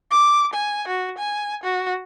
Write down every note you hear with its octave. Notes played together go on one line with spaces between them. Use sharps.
D6
G#5
F#4
G#5
F#4